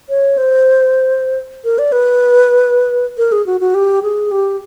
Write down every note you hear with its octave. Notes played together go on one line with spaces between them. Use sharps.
C#5
C5
A#4
D5
B4
A#4
G#4
F#4
F#4
G4
G#4
G4